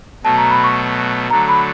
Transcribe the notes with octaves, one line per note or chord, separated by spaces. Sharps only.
B2 F#3 A3 A5
A#5
B5
C#6
D3 F#3 A3 A#5
B5